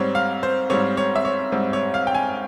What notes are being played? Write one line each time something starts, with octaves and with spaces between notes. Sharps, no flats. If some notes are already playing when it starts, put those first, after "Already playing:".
Already playing: G#2 G3 C4 C#5
F5
C5
G#2 G3 C4 C#5
C#5
E5
C#5
G#2 G3 C4
C#5
F5
G5
G#5